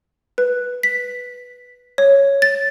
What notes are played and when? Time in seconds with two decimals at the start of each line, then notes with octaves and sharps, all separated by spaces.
0.38 B4
0.83 B6
1.98 C#5
2.42 A6